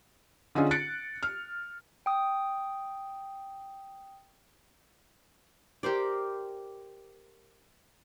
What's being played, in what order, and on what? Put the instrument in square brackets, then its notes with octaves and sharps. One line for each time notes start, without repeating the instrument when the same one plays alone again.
[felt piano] D3 C#4 D#4 F4 G#4
F#6 A6 C#7 D7
F6
[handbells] G5 D#6
[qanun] G4 A#4 C5 D5